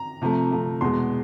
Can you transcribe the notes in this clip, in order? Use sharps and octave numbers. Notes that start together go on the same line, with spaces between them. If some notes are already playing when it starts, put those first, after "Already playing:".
Already playing: A#5
C3 F3 A3
C3 F3 A3
E2 B2 G#3 C6